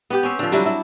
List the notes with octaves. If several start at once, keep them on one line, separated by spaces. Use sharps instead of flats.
B3 G4
C4 C#4
D3 F3
F#3 G3 D4 E4
E4